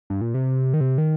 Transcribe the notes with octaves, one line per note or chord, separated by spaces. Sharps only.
G2
A#2
C3
D#3
C3
D#3